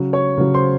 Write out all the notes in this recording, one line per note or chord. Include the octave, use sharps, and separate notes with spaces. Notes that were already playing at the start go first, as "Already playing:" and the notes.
Already playing: C#3 F#3
C#5 C#6
C#3 F#3
C5 C6